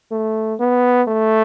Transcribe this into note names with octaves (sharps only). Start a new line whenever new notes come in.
A3
B3
A3